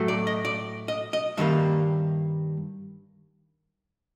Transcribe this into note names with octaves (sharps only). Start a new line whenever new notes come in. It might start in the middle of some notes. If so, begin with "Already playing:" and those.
Already playing: A2 F#3 A3
D5
D#5
D5
D#5
D#5
G2 D#3 G3 A#3 E5